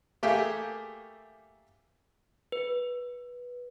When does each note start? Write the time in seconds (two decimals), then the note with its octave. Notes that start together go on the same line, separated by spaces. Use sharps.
0.23 A3 A#3 G4 G#4 E5 G5
2.52 B4